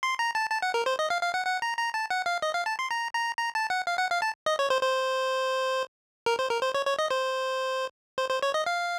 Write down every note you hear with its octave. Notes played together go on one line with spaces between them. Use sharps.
C6
A#5
A5
A5
F#5
A#4
C5
D#5
F5
F5
F#5
F#5
A#5
A#5
A5
F#5
F5
D#5
F5
A5
C6
A#5
A#5
A#5
A5
F#5
F5
F#5
F5
A5
D#5
C#5
C5
C5
A#4
C5
A#4
C5
C#5
C#5
D#5
C5
C5
C5
C#5
D#5
F5